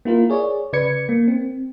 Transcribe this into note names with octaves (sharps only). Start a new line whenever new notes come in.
A#3 E4 F4 A#4
G#4 C#5 D5
C#3 B4 D5 G#6 C#7
A#3
C4